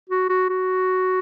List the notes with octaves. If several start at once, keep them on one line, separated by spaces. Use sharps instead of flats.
F#4
F#4
F#4